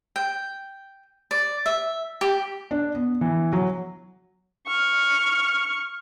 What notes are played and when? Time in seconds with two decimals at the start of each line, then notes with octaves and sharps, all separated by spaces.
0.16 G5
1.31 D5
1.66 E5
2.21 G4
2.71 D4
2.95 B3
3.21 E3
3.53 F#3
4.66 C#6 F6